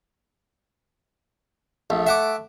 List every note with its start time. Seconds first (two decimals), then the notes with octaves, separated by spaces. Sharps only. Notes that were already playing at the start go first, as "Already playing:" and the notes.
1.90 A#1 A3
2.06 E5 F#5 D6